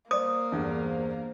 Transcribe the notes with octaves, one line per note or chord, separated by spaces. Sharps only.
A#3 C5 D5 D#6
E2 G2